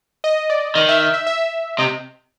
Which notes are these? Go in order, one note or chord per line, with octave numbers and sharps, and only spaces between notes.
D#5
D5
D#3 D#5
E5
E5
E5
E5
C3 D#5